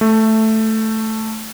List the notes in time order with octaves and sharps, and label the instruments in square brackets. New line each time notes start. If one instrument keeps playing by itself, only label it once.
[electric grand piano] A3